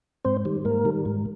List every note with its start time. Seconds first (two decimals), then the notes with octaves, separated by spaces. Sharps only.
0.25 G#2 C4 C5
0.45 D#3 G3
0.65 G#2 A#3 A#4
0.85 D#3 G3
1.05 G#2